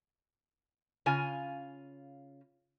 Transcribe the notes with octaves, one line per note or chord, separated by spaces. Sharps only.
C#3 F4 G#5